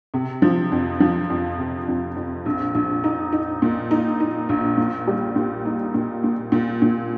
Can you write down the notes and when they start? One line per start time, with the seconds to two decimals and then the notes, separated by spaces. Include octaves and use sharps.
0.14 C3
0.42 F3
0.72 F2
1.00 F3
1.30 F2
1.59 C3
1.88 F2
2.16 F2
2.46 A#1
2.75 A#1
3.04 D#4
3.33 D#4
3.62 A#2
3.91 D#4
4.20 D#4
4.49 A#1
4.77 A#2
5.07 G3
5.36 A#2
5.66 D#4
5.94 A#2
6.24 A#2
6.52 A#2
6.82 A#2